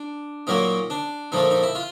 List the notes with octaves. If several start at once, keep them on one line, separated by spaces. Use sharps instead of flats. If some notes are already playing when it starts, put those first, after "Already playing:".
Already playing: D4
A#2 F#3 A#3 D#4
D4
A#2 F3 A3 D#4
D#4
E4
F4